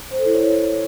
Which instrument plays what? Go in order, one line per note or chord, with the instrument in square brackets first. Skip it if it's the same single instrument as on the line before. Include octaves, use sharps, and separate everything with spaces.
[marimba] C5
A4
E4
C#5